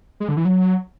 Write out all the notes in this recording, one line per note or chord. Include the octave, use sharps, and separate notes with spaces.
G#3
D3
E3
F#3